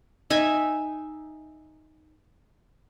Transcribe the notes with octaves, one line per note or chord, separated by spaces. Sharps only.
D#4 E5 G#5